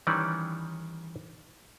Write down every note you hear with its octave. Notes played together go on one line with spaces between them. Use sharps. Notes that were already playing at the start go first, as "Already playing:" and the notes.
D#3 E3 G3 C#4 D5